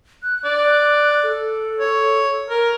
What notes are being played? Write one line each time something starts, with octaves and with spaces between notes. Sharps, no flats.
F#6
D5
A4
C#5
A#4